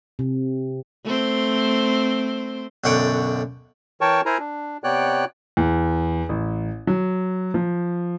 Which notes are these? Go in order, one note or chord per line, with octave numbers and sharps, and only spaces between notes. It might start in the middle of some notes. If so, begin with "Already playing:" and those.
C3
A3 C4 C5
B1 F#2 D3 C#5 F#5 G5
E3 A#4 C#5 G5 A5 C#6
E4 A#4 C5 G#5 A#5
D4
C3 B3 C#5 D5 G5 F#6
E2
A1
F#3
F3